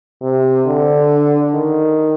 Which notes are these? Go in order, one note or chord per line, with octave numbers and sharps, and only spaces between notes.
C3
D3
D#3